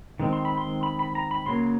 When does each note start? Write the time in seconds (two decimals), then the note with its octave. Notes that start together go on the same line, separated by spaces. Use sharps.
0.19 D#3 G#3 C4
0.33 C6
0.45 B5
0.58 C6
0.83 B5
0.99 B5
1.15 A#5
1.31 B5
1.46 C#3 F#3 A#3 C6